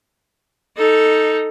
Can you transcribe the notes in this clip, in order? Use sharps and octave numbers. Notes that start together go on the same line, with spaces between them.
D#4 A4